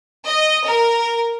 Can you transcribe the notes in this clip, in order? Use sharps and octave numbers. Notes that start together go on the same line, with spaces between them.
D#5
A#4